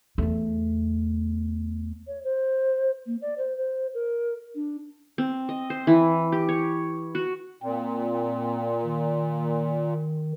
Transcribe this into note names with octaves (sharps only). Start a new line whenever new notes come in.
E2 A3
C#5
C5
A#3
D5
C5
C5
A#4
D4
C4
D#5
C5
E3
G4
C#5
F#4
A#2 C4
D#3